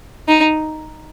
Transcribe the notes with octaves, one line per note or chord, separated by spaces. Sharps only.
D#4